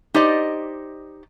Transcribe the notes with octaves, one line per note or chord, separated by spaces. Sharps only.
D#4 G4 C5 D5 D#5